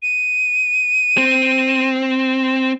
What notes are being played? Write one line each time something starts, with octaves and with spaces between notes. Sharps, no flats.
D#7
C4